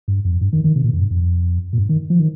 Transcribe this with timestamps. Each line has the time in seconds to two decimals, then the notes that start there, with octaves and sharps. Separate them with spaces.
0.08 G2
0.25 F2
0.41 G2
0.53 D#3
0.64 D#3
0.76 C3
0.84 A#2
0.93 F2
1.01 G2
1.11 F2
1.73 A#2
1.78 G2
1.89 D#3
2.10 F3
2.19 D#3